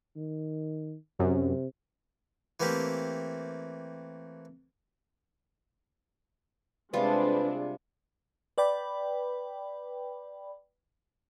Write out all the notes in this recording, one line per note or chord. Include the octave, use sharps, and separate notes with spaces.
D#3
F#2 C3
E3 A3 A#3 C4 G4
C3 G3 G#3 D4 F4 B4
B4 D5 G5 B5